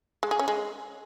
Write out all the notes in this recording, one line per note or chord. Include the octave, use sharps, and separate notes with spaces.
G#3
G#4
C#4
G#3